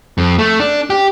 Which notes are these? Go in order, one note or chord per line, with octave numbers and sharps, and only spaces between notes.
F2
A3
D4
G4